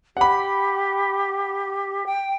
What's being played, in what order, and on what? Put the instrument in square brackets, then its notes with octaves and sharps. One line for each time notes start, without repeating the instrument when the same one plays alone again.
[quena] G4 [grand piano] F#5 B5
[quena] G5